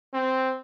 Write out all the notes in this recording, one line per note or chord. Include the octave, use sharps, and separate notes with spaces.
C4